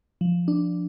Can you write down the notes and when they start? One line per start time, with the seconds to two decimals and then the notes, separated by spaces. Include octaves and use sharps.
0.21 F3
0.48 D4